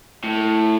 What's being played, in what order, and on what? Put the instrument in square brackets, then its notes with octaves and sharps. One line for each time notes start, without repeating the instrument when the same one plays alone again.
[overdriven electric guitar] A2